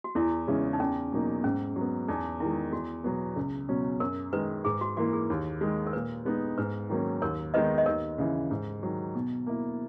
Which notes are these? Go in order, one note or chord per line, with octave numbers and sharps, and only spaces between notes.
F#4
E2 E4
C#3 E3 G#3 C#4
D#4
E2 C#4
B2 F#3 A#3 D#4
G#2 C#4
F#3
B3
E2 D#4
D#3 G#3 E4
E2 F#4
B2 F#3 B3
C#2
B2 F#3 C#4
F#2 A#4
D#3 G#3 B4
G#2 G#4
F#4
E3 A#3 E4 F#4
G#4
D#2
D#3 G#3
A#4
A#2 B4
G#3 B3 D#4
G#2 B4
D#3 F#3 A#3 C#4
D#2 A#4 C#5
D#3 G#3 B3 D#4 B4 D#5
D#5
D#2 A#4 C#5
C#3 E3
G#2
D#3 F#3
B2
A#3 E4